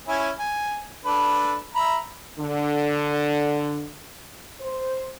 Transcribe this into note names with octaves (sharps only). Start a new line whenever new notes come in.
C#4 E4 G#5
G#5
D4 A4 B4
E5 A#5 B5
D3
C5